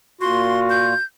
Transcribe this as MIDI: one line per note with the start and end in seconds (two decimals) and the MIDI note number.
0.21 0.94 46
0.21 0.94 65
0.21 0.96 66
0.21 0.60 84
0.70 1.04 91